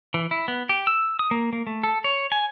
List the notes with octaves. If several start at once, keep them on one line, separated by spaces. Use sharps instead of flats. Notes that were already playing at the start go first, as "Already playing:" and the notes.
E3
E4
B3
G4
E6
D#6
A#3
A#3
A3
A4
C#5
G#5